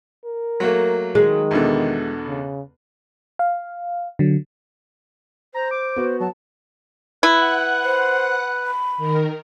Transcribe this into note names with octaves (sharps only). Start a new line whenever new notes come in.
A#4
F#3 A3 A#3
D#3 G#3
E2 B2 D3
C#3
F5
D3 F#3
C5 A#5
D6
B3 F#4
F#3 A5
E4 B4 F#5 F#6
C5
B5
D#3 A#4